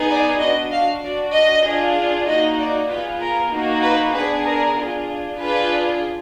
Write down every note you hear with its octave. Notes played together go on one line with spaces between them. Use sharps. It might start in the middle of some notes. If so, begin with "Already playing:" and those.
Already playing: B3 D#4 G#4
D5
D4 F#4 D#5
F5
D4 F#4 D5
D#5
D4 F4 G#4
A#3 D#4 F#4 D#5
D5
B3 F4 G#4 B4
A#4
A#3 D#4 F#4
B4
B3 D4 G#4 B4
A#4
D4 F4 G#4
D4 F4 G#4 B4